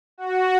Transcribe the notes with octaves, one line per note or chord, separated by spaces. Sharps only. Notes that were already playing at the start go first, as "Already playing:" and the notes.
F#4